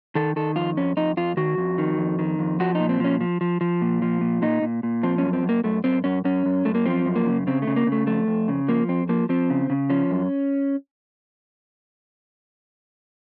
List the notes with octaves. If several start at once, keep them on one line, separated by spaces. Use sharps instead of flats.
D#3 A4
D#3 A4
F2 F4
F2 C#4
F2 D#4
F2 F4
D#3 F#4
F2
D#3
F2
D#3
F2
F3 F#4
D#4
A#2
C4
F3 C#4
F3
F3
F3
A#2
F3
A#2
A#2 D#4
A#2
A#2
F3 C4
F#2 C#4
C4
F#2
A#3
F#2 A3
F#2 C4
F#2 C#4
F#2 C#4
F#2
F#2 A3
A#3
F3 C4
F#2
A#3
C#3
C#3 C4
A3
C#3
A#3
C#3
A3
F2 A3
F2
C#3
F3 A#3
F2 C4
F3 A#3
F3 C4
C#3
C#3
F3 C#4
F#2